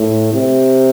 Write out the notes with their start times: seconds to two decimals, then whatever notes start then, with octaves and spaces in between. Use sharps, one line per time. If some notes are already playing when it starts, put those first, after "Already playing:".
Already playing: A2
0.33 C3